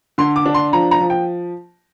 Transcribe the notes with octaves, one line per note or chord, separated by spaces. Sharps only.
D3 C6
D6
D4
C6
F3 A#5
A#5
F3
G5